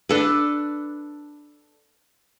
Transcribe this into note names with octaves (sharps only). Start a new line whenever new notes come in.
D4 A4 B4